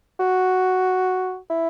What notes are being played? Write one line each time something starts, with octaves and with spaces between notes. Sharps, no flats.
F#4
E4